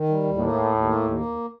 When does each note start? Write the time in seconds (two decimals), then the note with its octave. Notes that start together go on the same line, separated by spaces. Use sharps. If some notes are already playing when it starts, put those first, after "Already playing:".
Already playing: D#3
0.09 G3
0.23 D#2
0.37 A2 A#3
0.52 D#2
0.66 D#2
0.82 A#3
0.96 D#2
1.10 A#3
1.25 D#2